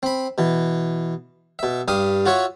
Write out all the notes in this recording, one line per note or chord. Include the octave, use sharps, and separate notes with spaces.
C4 B5
B2 E3
B2 E5
G2 G4 F5 D#6
F4 F#4 C#5 E5